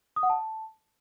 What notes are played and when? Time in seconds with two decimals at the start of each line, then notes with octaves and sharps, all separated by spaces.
0.16 D#6
0.23 F#5
0.30 A5